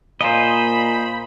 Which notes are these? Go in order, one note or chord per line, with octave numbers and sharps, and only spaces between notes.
A#2 C5 D#5 F5 G#5 A#5 B5